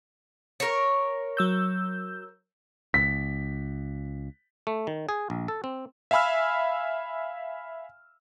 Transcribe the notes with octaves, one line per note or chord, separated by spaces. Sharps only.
A#4 C#5
F#3 E6 G6
C#2 B6
A3
D#3
G#4
A#1
A4
C4
E5 F5 G#5 B5 E6 F6